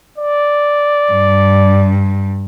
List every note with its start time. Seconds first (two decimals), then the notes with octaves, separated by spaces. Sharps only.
0.18 D5
1.12 G2